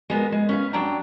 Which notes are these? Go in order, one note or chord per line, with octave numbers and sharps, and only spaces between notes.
G#3 B3 F#4 A#4
G#3
C#4 B4 F5
F#3 D4 G5 A5 A#5